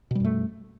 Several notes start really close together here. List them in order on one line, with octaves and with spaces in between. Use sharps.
B2 G3 F#2 A3